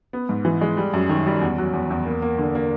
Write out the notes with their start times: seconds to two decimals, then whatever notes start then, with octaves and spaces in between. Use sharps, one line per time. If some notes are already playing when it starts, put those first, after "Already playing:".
0.13 B3
0.29 G#2
0.45 E3
0.61 G#3
0.77 G3
0.93 F#2
1.09 D#3
1.26 G3
1.41 E2
1.58 F#3
1.73 E2
1.90 E2
2.06 A#3
2.22 A#3
2.38 D3
2.55 A#3